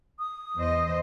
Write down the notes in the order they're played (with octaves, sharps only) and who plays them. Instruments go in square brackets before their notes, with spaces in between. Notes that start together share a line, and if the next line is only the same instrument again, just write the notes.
[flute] D#6
[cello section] E2 C5 D#5